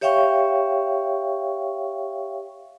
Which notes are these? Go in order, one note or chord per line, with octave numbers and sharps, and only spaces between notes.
G4 C#5 E5 F5 G5 C#6